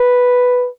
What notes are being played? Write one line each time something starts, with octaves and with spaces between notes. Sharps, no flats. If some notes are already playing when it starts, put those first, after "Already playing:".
Already playing: B4